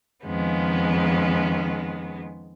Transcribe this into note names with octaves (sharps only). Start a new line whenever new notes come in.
F2 D#3 G#3 B3 C#4